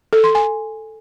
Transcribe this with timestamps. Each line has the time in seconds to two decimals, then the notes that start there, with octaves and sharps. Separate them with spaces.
0.13 A4
0.24 C6
0.35 G#5